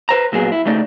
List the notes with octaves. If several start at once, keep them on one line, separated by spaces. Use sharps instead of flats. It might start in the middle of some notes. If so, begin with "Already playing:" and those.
B4 C5 A#5
B1 A#2 F#3 B3 G#4
E4
D#2 C#3 A3 D#4 D5